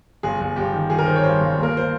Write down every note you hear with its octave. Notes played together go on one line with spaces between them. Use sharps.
G1 G#4
G1
G1 G4
D#3
D#3 G#4
A#4
D#3 C5
C#5
G2 C5
G1
D#2
A#4
C5